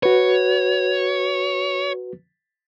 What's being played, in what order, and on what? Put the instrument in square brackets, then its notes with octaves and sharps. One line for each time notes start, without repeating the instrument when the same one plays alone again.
[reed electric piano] F#4 B4 [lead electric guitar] C#5